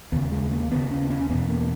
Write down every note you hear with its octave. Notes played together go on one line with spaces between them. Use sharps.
D#2 C#3 B3
G#3
A#3
D#2 C#3 B3
C#4
C#4
E2 B2 B3
A#3